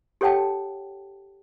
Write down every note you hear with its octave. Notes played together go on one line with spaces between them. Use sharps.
G4 A4 C#5 F#5 G5 A5